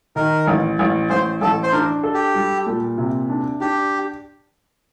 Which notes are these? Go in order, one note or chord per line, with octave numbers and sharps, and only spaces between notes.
D#3 A#4
A1
A1
A1 C5
A1 A4
C5
D4 A#4
A4
G4
G3
A#2
C3
D4
D4 G4